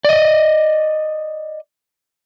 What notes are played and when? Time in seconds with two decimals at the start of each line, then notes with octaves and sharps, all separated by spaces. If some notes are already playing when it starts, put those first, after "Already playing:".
0.05 D5 D#5